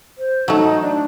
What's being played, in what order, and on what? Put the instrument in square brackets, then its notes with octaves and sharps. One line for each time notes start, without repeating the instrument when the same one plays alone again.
[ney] C5
[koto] F#3 A3 [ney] D#4
[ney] D4